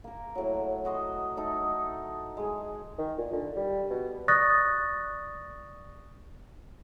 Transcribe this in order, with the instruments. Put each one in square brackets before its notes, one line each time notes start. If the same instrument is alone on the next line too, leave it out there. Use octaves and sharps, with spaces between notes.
[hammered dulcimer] A#3 A#4
A2 F#3
F#4 D#5 C6
A3 D#4 A4
G#3 G#5
[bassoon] D#3
A#2
D3
G3
B2
[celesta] D5 C#6 D#6 F#6 A6 A#6